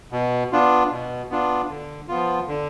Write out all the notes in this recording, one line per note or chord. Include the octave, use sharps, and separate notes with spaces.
B2
B3 D4 F4
B2
B3 D4 F4
D3
F3 B3 F4
D3